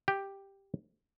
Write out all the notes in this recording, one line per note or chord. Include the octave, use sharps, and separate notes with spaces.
G4